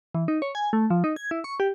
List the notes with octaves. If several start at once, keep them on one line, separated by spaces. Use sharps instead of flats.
E3
D#4
C#5
G#5
A3
F3
D#4
G#6
E4
C#6
G4